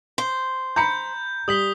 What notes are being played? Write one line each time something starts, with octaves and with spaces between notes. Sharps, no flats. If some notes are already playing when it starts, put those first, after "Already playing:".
C5
A#5 B5 G6 C#7
G3 D#6 B6 F#7 G7